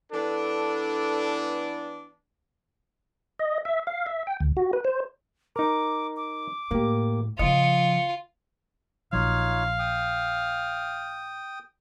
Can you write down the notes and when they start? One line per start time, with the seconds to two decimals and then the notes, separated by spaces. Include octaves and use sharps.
0.12 E3 B3 D4 A4
3.39 D#5
3.65 E5
3.87 F5
4.06 E5
4.27 G5
4.40 D2
4.57 F#4
4.73 B4
4.85 C5
5.56 D#4 A#4 D6
6.16 D6
6.71 A2 A#3 G4
7.39 C#3 F3 F4 D#5 C#7
9.13 A#1 F#3 D#4 F4 C#5 F5
9.79 G5 D#6